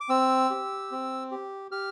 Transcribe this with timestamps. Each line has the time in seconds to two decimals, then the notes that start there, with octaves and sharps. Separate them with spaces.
0.01 D6
0.09 C4 E6
0.50 G4
0.91 C4
1.31 G4
1.71 G4 F6